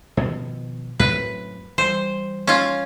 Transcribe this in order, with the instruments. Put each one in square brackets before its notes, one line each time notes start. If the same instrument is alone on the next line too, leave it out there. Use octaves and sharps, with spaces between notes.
[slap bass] B2 D#3 F3
[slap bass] F#2 A2 C4 [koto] B4
[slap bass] E3 G3 [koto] C5
[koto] C#4 F4